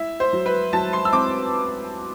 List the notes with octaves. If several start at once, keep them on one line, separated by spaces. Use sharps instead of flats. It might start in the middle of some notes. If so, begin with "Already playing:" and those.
Already playing: E4 E5
C5
F#3
B4
F#3 A5
C6
E6
C4 D6